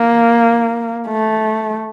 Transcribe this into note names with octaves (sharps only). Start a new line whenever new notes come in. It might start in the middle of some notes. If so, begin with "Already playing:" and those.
Already playing: A#3
A3